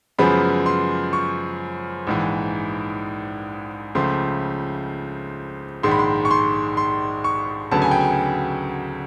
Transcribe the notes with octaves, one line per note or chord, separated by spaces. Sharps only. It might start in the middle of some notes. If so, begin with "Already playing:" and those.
F#2 C#3 F3 G#3 B3 B5
C6
C#6
A#1 G#2 E3
C#2 C#3 F3 A3 C6
A#1 G#2 D#3 G#3 C6
B5
C6
C#6
C6
C6
C#6
D2 C#3 F#3 B3 A5
G#5
G5
G#5